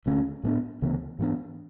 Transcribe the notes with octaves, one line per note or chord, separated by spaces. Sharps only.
D2 D3 A3 C#4
A2 G#3 B3 D4
D2 C#3 E3 B3
G#2 E3 B3 D4